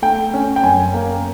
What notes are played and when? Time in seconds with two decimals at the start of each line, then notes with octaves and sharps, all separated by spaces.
0.02 A3 G5
0.34 C#4
0.56 G5
0.64 F#2 G#5
0.94 A#3